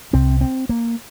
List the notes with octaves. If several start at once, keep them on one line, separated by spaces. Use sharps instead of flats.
C2 C3 C4
C4
A#3